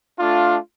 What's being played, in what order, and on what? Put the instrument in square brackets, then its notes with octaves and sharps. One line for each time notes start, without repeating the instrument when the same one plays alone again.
[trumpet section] A3 D4 F4